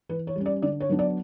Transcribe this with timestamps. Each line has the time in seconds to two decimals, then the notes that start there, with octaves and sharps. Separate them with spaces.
0.09 E3 B4
0.27 C#5
0.36 G3 C#4
0.46 D5
0.62 D3 D5
0.80 C#5
0.89 F#3 B3 D4
0.99 D5